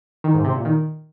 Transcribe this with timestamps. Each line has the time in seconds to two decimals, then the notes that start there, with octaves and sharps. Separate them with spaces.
0.24 D#3
0.34 G#2
0.45 C3
0.55 A#2
0.65 D#3